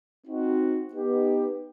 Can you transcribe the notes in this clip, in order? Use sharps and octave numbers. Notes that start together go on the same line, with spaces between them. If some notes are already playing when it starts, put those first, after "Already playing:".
C4 D#4 F#4
B3 D#4 G4